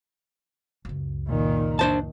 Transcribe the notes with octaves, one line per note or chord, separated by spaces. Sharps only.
C#2 F#2
A#2 D#3
D4 C5 A5